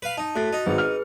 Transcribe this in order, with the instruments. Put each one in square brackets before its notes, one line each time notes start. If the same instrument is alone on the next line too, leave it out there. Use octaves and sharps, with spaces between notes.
[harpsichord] B4 F5
[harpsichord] D#4 [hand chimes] A5
[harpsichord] A2 [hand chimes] F#4 F#6 A6
[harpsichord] D#4
[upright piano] G#1 [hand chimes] G#4 B4
[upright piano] F6